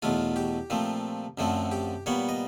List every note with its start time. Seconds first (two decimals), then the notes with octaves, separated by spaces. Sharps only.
0.02 E2 B2 F#3 A3 F4
0.36 G4
0.70 A#2 F3 A3 C4
1.38 F#2 D3 F3 A3 C4
1.71 G4
2.06 A#2 G3 B3 C#5
2.29 D#5